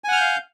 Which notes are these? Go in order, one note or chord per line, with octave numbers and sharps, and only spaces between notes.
F5 F#5 G#5 F6 G6